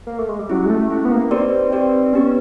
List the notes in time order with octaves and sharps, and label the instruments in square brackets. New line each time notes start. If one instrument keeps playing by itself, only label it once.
[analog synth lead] A#3
A3
G#3
G3
[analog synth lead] F#3 [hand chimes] C#4 E4 G4
[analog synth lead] G#3
A3
[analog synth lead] A3 [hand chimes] C#4 E4 G4
[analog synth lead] B3
A#3
[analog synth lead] C4 [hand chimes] D#4 G4 B4 D5
[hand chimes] D#4 G4 B4 D5
[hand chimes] B3 D#4 G4 B4 [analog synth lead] C#4